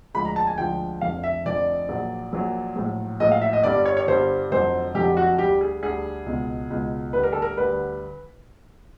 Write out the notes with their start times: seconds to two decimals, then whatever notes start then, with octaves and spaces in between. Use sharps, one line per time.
0.14 D2 D3 F3 G#3 B5
0.25 A#5
0.36 A5
0.47 G#5
0.58 D2 D3 F3 G#3 G5
1.01 F1 F2 D3 F5
1.23 E5
1.45 F1 F2 D3 D5
1.89 A#1 A#2 F#3
2.33 A#1 A#2 F#3
2.76 A#1 A2 F#3
3.20 A#1 A2 F#3 D#5
3.32 F5
3.42 E5
3.53 D#5
3.63 G1 G2 D3 G3 D5
3.85 C#5
3.97 C#5
4.08 G1 G2 D3 G3 C5
4.51 F1 F2 D3 F#3 C5
4.94 F1 F2 D3 F#3 G4
5.17 F#4
5.38 D2 D3 G3 G4
5.61 G#4
5.82 D2 D3 G3 G#4
6.26 C#2 B2 G#3
6.70 C#2 B2 G#3
7.13 D2 D3 G3 B4
7.23 A#4
7.33 A4
7.42 A#4
7.57 D2 D3 G3 B4